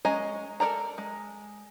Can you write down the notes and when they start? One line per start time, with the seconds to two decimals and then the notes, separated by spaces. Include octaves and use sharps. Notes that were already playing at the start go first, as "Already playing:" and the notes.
0.05 G#3 C#4 D#5 G#5 A#5
0.60 A4 A#4 D5 A#5
0.98 G#3